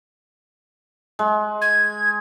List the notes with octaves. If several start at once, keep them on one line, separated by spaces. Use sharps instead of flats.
G#3
G#6